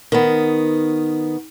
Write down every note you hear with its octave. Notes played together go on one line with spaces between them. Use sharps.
D#3 B3